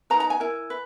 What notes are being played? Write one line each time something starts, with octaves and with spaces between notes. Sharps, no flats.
D#4 G#4 B4 A#5
A#5
G#5
E4 A#4
B4